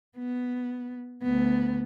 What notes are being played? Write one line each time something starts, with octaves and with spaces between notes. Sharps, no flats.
B3
D2 B3